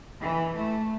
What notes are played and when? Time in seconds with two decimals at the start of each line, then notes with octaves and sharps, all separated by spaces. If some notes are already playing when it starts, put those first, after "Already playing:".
0.21 E3
0.56 A3